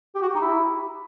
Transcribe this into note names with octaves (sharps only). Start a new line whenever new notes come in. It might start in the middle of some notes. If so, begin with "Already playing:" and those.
G4
F#4
G4
D#4
E4